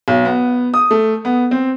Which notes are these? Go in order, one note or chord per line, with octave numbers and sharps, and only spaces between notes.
B1
B3
D#6
A3
B3
C4